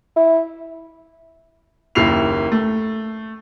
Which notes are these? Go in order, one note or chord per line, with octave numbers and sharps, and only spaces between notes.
E4
F#1 D#2 E4 C7 F7
A3